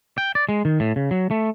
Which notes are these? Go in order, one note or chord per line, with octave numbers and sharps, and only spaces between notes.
G5
D5
G#3
D#3
A2
C#3
F#3
A3